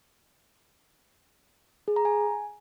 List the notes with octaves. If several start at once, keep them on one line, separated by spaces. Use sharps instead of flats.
G#4
A#5
G#5